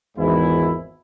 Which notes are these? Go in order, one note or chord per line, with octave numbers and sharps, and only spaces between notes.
G#1 E2 G#2 E3 E4